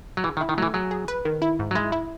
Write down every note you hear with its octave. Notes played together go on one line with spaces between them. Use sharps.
F#3
E3 G#4
D#3
E4
D#3
E3 F#3 A3
F#3 G#4
G#4
B4
D#3
E4
G#2
F#3
G#3 E4
E4